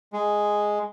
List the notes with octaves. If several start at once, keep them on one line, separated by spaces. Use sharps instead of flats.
G#3